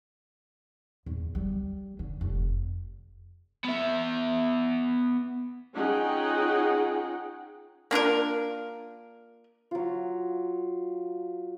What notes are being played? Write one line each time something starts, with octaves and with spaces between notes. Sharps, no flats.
E2
G3
D3
F1
B3 E5
C#4 D#4 F4 G#4 F#5 G5
A#3 D4 F4 A#4
F#3 F4